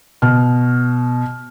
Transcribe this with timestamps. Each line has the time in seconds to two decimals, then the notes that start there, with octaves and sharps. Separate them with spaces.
0.22 B2 F6